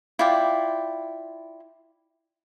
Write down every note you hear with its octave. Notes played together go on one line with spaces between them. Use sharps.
E4 F4 D5 G5